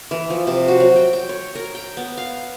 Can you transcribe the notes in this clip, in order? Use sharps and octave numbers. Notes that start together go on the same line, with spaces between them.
E3
F3
C3
F#4
F#3
G5
G5
C#5
A#4
G5
B3
F5